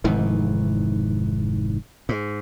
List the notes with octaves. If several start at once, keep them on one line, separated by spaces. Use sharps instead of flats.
F1 G#2 D#3 E3
G#2